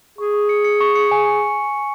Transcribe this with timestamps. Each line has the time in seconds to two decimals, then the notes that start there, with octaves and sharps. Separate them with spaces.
0.18 G#4 C#6
0.34 C#6
0.49 C#7
0.64 C#7
0.81 C#6
0.96 C#7
1.11 G#5